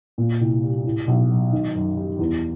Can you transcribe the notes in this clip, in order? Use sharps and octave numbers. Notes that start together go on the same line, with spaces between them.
A#2
C2
G3
A2
B1
F#3
D#3
F#2
G3
E2